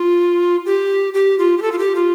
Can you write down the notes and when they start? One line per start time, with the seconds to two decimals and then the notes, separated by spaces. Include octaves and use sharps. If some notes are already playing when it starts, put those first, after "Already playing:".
Already playing: F4
0.66 G4
1.14 G4
1.39 F4
1.58 G4
1.62 A4
1.72 F4
1.79 G4
1.95 F4